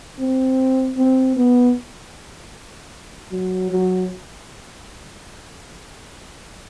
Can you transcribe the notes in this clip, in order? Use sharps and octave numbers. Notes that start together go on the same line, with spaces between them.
C4
C4
B3
F#3
F#3